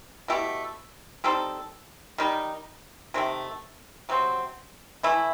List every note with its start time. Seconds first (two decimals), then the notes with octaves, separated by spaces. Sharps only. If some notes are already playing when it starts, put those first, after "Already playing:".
0.28 B2 A3 E4 G4
1.24 G3 C4 D#4 A4
2.18 D#3 G3 D#4
3.14 C3 D#3 A3
4.09 C3 F#3 C4
5.03 E3 A3 E4